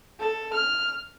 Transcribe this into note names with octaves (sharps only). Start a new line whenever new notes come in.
A4
F6